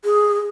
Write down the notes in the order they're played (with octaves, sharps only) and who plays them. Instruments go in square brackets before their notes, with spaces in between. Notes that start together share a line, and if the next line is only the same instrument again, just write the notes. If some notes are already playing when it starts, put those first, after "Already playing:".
[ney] G#4